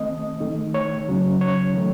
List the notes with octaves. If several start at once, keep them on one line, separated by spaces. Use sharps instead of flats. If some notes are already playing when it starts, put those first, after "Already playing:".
Already playing: D#3 A3 C4 D#5
D#3 A3 D#4
C#5
C#3 F#3 C#4
C#5
D#3 F#3 A3